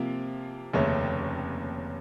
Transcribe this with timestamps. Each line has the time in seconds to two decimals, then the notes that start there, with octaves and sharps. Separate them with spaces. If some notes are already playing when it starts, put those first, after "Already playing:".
Already playing: C3 F3 A#3
0.73 F1 D#2 C#3 A3 C#4